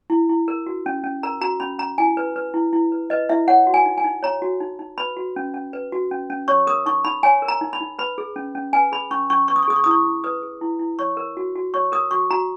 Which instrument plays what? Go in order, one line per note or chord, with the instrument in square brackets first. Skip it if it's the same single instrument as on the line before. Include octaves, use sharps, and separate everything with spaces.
[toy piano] E4
E4
A#4
F#4
C#4
C#4
A#4 A#5
F#4 A#5
C#4 B5
C#4 A#5
E4 G#5
B4
B4
E4
E4
B4
B4 D#5
E4 E5
C#5 F#5
F#4
G#5
D#4
G#5
D#4
C#5 A#5
F#4
D#4
D#4
B4 B5
F#4
C#4
C#4
B4
F#4
C#4
C#4
C#5 C#6
A#4 D#6
D#4 C#6
D#4 B5
C#5 G#5
A#4
A#5
D#4
B5
D#4
B4 B5
G#4
C#4
C#4
B4 G#5
G#4 B5
C#4 C#6
C#4 C#6
B4 C#6
D#6
C#6
G#4 D#6
C#6
E4 D#6
C#6
E4
B4 D#6
G#4
E4
E4
C#5 C#6
A#4
F#4
F#4
C#5 C#6
A#4 D#6
F#4 C#6
F#4 A#5